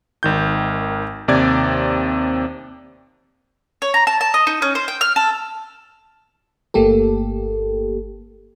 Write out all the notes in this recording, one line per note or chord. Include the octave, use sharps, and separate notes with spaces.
G#1 D#3 G6
D#2 C3 D5 G#6
C#5
A#5
A5
A5
D#5
D#4
C#4
C5
G5
F6
A4
G1 A3 A#3 G4 A4